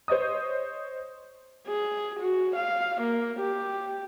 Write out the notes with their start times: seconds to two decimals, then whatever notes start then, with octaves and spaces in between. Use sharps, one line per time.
0.08 C5 C#5 D#5 D#6
1.67 G#4
2.19 F#4
2.56 F5
3.01 A#3
3.40 G4